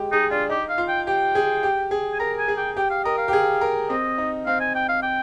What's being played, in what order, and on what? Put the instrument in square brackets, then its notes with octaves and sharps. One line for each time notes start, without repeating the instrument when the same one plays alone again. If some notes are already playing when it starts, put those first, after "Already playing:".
Already playing: [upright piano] G#3 G4
[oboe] D#4 [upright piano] G#4
[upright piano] D4 [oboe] F4
[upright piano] D#4 [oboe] G4
[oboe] F5
[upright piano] F4
[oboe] G5
[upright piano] G4 [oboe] G5
[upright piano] G#4
G4
G#4
[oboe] G#5
[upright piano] A#4 [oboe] A#5
[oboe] G#5
[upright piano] G#4
[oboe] G5
[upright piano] G4 [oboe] G5
[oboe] F5
[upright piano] A#4 [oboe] D#5
[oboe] F5
[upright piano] G4
G#4
A#4
[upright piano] C4 [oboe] D#5
[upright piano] D#4
[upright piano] C4 [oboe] F5
[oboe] G#5
G5
F5
G5